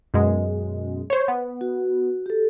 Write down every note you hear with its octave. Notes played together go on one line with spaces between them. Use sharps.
F#2 B2 G#3
C5 C#5
B3
F#4
G4 A4